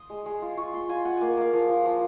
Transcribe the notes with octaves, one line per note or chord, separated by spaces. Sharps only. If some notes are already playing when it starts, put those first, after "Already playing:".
Already playing: C6 D#6
G#3
G#3
F4
F4 C#6
F4 C6
F4 G#5
F4 F#5
A#3 G#5
A#3 F5
F3
F3
F3